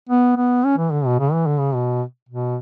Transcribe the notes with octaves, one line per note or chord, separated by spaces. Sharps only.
B3
B3
C#4
E3
D3
B2
C#3
E3
D3
C#3
B2
B2